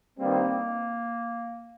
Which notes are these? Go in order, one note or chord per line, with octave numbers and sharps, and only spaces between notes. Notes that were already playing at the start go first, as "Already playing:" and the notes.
G2 D#3 G3 A#3 C4